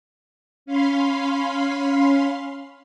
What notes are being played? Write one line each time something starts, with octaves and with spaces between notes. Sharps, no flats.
C#4 F5 B5 C6